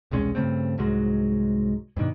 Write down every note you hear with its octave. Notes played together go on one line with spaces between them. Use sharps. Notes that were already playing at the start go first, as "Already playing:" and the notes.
E1 C2 G#3 C#4
G2 C#3 A3 C4
C2 G#2 F#3 G#3
G2 B2 D#3 D4